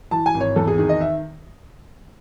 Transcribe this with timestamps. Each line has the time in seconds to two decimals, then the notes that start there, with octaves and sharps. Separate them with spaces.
0.11 E3 A5
0.26 G#5
0.34 G#1
0.41 C#5
0.56 E2 A4
0.68 G#4
0.78 D#3 G#4
0.89 D#5
1.01 E5